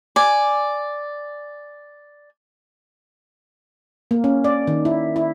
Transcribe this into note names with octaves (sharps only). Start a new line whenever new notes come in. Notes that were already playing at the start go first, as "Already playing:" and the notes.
D5 G#5
A#3
C#4
D5
D#3
E4
E4